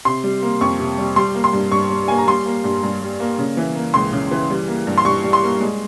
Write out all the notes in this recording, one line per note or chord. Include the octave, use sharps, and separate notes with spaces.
C3 C6
G3
A#3
F2 C#6
C3
G3
G3 C6
A#3
C6
G2
G2 C#6
G3
A#3 G#5
A#5
G3 C6
A#3
G2
G2
G3
A#3
C#3
E3
A#3
C#2 C6
C#3
E3
G3
A#3
G2
C6
G2 C#6
G3
C6
A#3
G#3